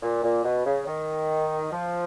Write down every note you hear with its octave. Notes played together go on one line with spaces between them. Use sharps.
A#2
A#2
B2
C#3
D#3
F3